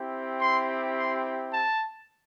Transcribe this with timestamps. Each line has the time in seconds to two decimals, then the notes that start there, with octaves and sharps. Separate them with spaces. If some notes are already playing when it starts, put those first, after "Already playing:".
Already playing: C4 E4 G4
0.41 C6
0.96 C6
1.52 A5